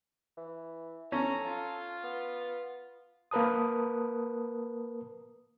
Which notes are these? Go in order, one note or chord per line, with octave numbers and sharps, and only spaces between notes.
E3
C#4 A4 A#5
F4
B3
A#3 A#4 B4 A5 D#6